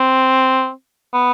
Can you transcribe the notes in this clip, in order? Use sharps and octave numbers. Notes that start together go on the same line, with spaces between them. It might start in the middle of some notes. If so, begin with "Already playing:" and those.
Already playing: C4
B3